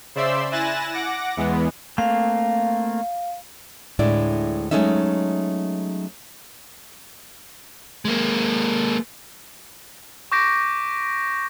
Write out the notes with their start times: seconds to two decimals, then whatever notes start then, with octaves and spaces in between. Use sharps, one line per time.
0.15 C#3 C5 D5 E5 C6 E6
0.51 E4 G#5 F#6 A6 A#6 E7
0.93 F#5 D6 A#6
1.37 E2 E3 G#3 B3
1.98 A3 A#3 C4 F5
3.99 D2 A2 G#3 D4 E4 D5
4.71 F#3 G#3 A3 C#4 D#4 E5
8.05 G#3 A#3
10.32 C#6 D6 G6 A#6 B6 D7